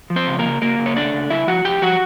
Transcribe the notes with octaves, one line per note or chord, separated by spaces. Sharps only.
F3
C4 C5
C#3
A#3 A#4
C#3
C#3 A#3 A#4
C#3
C#5
A3 D4 D5
C#3
C#3 E4 E5
F3 F#4 F#5
F2 G4 G5
F3 F#4 F#5